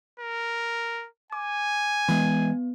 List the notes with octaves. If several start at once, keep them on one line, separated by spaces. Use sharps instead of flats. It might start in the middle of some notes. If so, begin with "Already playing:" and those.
A#4
G#5 D6
E3 G#3 B3